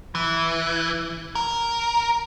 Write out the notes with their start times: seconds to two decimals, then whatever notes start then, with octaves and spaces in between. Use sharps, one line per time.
0.15 E3
1.35 A#4